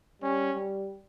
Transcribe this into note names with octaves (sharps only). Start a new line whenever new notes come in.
G3 C#4
G3